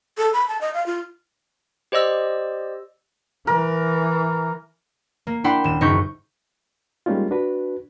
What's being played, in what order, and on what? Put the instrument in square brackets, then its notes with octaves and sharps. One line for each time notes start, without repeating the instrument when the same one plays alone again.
[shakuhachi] A4
B5
A5
D#5
F5
F4
[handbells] G4 C5 D5 D#5 E6
[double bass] E3 [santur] A#4
[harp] A#3
D4 E4 F#5 G5 B5 C6
D#1 E7
F#1 D#4 C#6 G6 B6
[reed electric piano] G3 G#3 A#3 C#4 D#4 F4
D4 F#4 B4